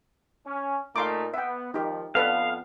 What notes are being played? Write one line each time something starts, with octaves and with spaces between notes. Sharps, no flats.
C#4
A#2 A3 D#4 F5 C6 D6
B3 E5 G5
D#3 F3 D#4 G4
F2 B3 A4 B4 D5 F5